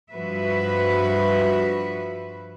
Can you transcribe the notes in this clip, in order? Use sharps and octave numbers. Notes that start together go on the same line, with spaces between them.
G2 F3 F#4 B4 E5